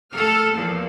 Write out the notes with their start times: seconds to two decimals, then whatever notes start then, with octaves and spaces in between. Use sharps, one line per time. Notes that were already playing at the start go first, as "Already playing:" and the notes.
0.13 A3 A4 F6
0.53 E2 A#2 F3